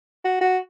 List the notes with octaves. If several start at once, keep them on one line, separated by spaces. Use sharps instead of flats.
F#4
F#4